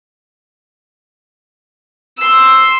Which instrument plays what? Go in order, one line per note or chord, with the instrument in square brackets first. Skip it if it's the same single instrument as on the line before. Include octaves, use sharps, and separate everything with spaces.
[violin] C6 E6